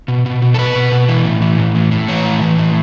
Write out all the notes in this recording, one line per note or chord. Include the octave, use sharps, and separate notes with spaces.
B2
B2
B2
A4
B2 B4
B2
B2
E3
A2
E3
A2
E3
A2
E3 C#5
A2
E3
A2